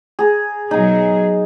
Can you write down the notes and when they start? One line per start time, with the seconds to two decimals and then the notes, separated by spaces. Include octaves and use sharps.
0.19 G#4 A#5
0.71 B2 F#3 D#4 G#4 A#5